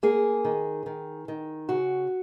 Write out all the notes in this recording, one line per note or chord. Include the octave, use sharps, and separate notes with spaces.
A#3 G#4
D#3
D#3
D#3
C#3 F#4